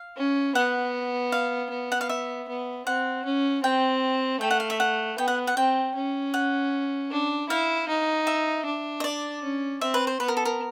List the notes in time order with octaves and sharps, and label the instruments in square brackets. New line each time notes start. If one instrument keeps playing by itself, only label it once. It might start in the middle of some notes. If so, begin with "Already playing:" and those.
Already playing: [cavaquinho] F5
[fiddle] C#4
[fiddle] B3 [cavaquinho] F#5
[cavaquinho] F5
[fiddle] B3
[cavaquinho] F#5
F5
E5
[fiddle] B3
[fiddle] C4 [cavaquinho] F#5
[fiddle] C#4
[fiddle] C4 [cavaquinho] G5
[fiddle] A3 [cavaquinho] G5
[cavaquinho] F#5
F5
E5
F#5
[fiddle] B3 [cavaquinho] G5
[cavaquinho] F#5
F#5
[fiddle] C4 [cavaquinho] G5
[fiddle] C#4
[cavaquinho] F#5
[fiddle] D4
[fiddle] E4 [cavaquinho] F5
[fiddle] D#4
[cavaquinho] E5
[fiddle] D4
[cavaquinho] D#5
D5
[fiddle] C#4
[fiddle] C4 [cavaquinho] E5
[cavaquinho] B4
C5
[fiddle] B3 [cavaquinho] B4
[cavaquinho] A#4
A4
A#4